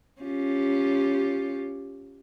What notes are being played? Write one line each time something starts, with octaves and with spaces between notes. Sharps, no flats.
C#4 F4 G4